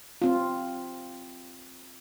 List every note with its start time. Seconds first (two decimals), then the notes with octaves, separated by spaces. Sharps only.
0.22 C4 F4